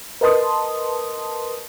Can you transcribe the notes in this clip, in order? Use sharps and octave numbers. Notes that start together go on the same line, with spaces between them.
A#4 B4 D#5 A5 C6 D#6